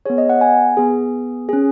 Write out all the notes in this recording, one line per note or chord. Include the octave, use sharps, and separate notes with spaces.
B3 G#4 C#5
D#5
F#5
G#5
B3 G#4
C#4 G#4